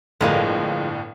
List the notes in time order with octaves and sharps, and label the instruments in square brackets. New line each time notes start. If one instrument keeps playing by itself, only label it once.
[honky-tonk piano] G1 A2 [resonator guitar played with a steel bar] F3 G#3 A#3